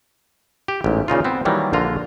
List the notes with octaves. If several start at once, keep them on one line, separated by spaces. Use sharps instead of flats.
G4
A1 G#2
A#2 C#3 D#4 F4
B3 C4
D#3 E3 F#3 G3 A#3
A#1 D3 F4 A#5